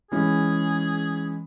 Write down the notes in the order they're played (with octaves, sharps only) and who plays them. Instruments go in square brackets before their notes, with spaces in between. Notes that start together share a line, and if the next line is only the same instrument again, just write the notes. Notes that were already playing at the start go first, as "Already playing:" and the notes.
[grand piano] E3 G#3 C#4 [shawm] G#4